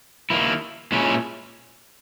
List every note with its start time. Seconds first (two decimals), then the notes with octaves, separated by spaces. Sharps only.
0.30 D#3 A#3 E4
0.92 A#2 G#3 C#4 E4